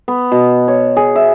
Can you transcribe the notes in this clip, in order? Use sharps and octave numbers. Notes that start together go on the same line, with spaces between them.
B3
B2
C#5
G#4
E5